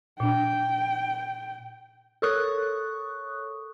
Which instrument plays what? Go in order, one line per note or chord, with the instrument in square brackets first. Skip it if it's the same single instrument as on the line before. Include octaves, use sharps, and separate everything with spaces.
[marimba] A#2 D4 [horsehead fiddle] G5
[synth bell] A4 A#4 C#5 C#6 D#6 F#6